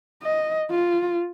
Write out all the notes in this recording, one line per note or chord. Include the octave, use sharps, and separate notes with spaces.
D#5
F4